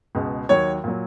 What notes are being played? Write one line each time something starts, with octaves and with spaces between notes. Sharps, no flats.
C#2 B2 G#3
D#2 D#3 F#3 C#5
A#2 F#3